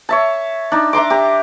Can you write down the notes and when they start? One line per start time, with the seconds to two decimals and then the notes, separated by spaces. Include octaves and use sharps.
0.09 C#5 E5 A5
0.72 D4 D#4
0.93 E5 A#5 C6 D6
1.10 G4 A#5